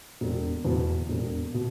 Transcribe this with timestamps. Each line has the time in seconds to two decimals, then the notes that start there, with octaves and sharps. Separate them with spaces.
0.21 E1
0.65 E2 B2
1.09 E1
1.54 B2